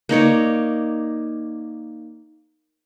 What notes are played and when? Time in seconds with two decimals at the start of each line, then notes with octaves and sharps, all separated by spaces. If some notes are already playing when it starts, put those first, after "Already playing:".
0.09 A#3 D#4 C#5 D5